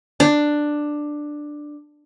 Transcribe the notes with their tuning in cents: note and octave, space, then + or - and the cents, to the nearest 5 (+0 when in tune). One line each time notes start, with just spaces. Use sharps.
D4 +10